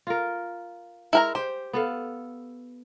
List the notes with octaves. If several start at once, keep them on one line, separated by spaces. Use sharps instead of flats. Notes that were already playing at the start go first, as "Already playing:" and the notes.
F4 A#4
G#3 E4 A#4 A#5
G4 C5
B3 A4 F5